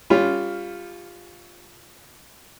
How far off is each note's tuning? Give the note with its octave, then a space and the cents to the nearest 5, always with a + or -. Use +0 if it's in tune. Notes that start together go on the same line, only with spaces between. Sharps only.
G3 +20 C#4 +15 F4 +0